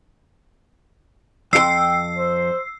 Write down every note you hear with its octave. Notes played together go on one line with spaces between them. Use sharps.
F2 F#4 G5 C6 E6 C7
C5